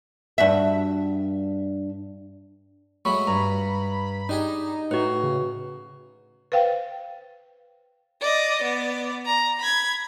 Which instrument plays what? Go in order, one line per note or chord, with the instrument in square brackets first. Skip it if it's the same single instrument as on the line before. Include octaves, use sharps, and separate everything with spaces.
[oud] G2 F#4 E5
[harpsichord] F#3 G#3 A3 [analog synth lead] B5 [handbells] C#6
[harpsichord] G2 [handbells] A#5
[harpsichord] D4 G4 G#4 [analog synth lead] D#4
[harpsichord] A2 [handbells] F#4 B4
[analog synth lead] C#3
[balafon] B4 C5 F5 G5
[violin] D5 D#5
B3 D5
A#5
B5 G#6